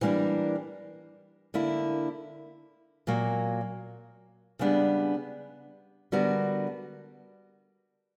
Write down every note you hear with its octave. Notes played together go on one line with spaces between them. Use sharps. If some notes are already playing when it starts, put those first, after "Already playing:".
E3 G3 A#3 D4 A#4
D3 A#3 E4
A#2 F#3 A#3
C#3 G3 B3 D4
D3 G3 B3 F#4 A#4